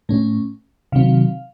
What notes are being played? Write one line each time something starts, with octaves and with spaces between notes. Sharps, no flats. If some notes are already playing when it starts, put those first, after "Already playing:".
A2 A3 C#4
C3 D#3 F#3 C4 F5